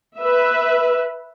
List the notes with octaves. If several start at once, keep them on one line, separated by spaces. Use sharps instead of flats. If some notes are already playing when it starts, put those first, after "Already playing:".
B4 E5